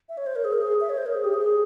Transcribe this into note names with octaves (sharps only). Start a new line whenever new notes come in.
E5
C#5
C5
A#4
G#4
A#4
G#4
E5
C#5
C5
A#4
G#4
G4
G#4